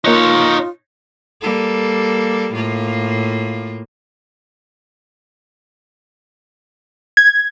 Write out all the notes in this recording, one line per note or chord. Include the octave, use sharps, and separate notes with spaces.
A#3 D#4 F4 C#5 D#5 F#6
G3 A#3 A4
A2 A#3 F4
G#6